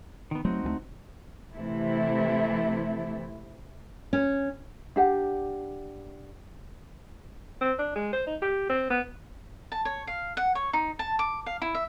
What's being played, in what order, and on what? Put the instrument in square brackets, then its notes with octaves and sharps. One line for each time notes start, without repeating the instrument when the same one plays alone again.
[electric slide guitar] D#3 B3
[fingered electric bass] F#3 A3 [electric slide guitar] C4 D#4 F#4
[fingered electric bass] D2 F3 A3
[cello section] C3 E3 A3 E4
[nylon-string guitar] C#4
[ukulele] D4 G4 F#5
[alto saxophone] C4
D4
G#3
C5
D#4
G4
C4
B3
[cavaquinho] A5
C#5
F5
F#5
C#5
D#4
A5
D6
F5
E4
E5